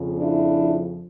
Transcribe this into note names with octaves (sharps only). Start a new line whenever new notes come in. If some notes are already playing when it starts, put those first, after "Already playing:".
Already playing: F2 C#3 F3
D4 E4